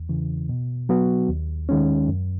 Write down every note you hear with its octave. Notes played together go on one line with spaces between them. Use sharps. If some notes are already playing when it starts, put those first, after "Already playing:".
Already playing: E2
C#3 E3
B2
F#3 B3 F#4
D#2
D#3 G#3 C#4
F#2